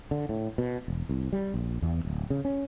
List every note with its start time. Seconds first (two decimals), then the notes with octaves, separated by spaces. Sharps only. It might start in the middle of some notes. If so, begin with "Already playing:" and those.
0.11 D3
0.29 A2
0.58 B2
0.88 E1
1.09 C2
1.33 G3
1.54 A#1
1.82 E2
2.05 D1
2.30 C#3
2.45 C#4